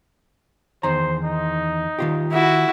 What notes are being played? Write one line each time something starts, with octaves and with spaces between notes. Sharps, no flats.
E2 D#3 C5 A#5
D#4
D#3 F4 G4
E4 F#4